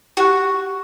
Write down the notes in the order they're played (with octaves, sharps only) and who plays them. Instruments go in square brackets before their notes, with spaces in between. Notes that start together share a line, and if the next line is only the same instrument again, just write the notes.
[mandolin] F#4 [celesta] G4 F#6